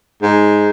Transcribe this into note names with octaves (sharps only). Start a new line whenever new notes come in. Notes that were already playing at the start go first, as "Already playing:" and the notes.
G#2